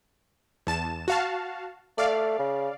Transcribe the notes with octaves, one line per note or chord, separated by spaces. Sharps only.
E2 A5 E7
F#4 F5 A5
A3 D5 F5
C#3